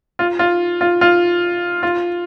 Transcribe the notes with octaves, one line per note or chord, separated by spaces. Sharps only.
F4
F4
F4
F4
F4